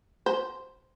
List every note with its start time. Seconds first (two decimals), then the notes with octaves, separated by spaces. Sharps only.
0.26 C5